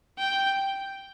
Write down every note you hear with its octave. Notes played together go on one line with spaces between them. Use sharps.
G5